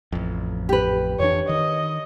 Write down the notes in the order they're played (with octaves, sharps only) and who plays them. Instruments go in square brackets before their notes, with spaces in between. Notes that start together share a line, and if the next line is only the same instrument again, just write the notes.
[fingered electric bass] A1 F2
[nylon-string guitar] G4 B4
[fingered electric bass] F2 E3 D4 [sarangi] C#5
[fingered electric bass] D#3 [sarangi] D#5